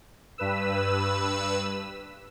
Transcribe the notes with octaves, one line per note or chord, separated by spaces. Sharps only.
G2 B4 E6